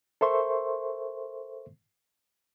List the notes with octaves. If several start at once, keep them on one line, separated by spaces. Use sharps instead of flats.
A4 A#4 C5 E5 C6 C#6